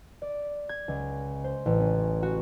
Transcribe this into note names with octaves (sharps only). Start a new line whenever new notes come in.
D5
G#6
C#2
C5
A1
C#4
F#4